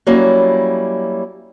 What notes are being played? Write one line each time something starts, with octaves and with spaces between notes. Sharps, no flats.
F#3 G3 A#3 C#4 E4